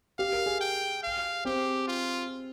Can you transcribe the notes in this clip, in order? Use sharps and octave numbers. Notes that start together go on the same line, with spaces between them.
G4 F5
A#4
G#4
G5
F5
C4 G4
F4